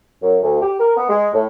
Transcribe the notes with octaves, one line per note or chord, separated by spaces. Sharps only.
F#2
D2
G4
A#4
B3
G#3
A2